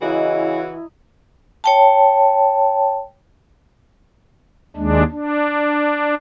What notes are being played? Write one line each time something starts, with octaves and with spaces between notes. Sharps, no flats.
C#3 E3 E4 F#4 D#5 A#5
C#5 G5 A5
D#2 G#3 D4
D4